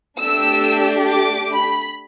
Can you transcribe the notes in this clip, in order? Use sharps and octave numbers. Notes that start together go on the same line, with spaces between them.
A3 D4 G4 E6
D6
B5